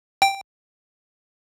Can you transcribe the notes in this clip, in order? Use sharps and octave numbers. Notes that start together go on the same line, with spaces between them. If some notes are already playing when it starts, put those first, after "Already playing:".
G5